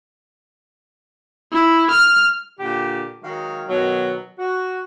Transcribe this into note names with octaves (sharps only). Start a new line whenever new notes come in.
E4
F6
A#2 D3 G4
D#3 F#3 G#3 F#4 F5
B2 D#3 F#3
F#4